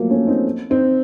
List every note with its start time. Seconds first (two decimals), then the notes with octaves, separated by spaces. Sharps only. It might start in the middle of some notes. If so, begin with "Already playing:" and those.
Already playing: F3 F#3 A3 A#3
0.10 A#3 C#4
0.27 C4 D#4
0.70 C4 D#4